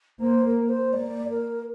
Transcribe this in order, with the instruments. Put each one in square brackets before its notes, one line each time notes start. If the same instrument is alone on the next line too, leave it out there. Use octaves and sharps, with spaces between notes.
[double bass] A#3 [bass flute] C5
[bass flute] A#4
C5
[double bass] A#3 [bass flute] D5
[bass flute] A#4